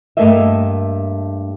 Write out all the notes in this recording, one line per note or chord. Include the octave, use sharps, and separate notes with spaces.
G2 E3 A3 A#3 D#5 E5